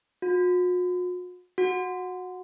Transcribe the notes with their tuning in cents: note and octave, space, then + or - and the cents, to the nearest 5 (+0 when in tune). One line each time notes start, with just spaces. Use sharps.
F#4 -45
F#4 -20